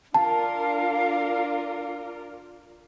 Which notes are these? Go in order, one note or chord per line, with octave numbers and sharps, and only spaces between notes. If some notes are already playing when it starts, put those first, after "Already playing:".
D4 F4 A#4 F5 A5